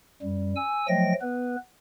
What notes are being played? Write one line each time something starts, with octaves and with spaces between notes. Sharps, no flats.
F#2 G3
G#5 E6
F3 F#3 A3 D#5 G5 A#6
B3 B4